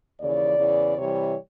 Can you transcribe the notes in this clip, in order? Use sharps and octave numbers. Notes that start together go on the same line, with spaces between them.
D#2 C#3 E3 D5
E2 C#3 E3
C3 E3 G3 C#5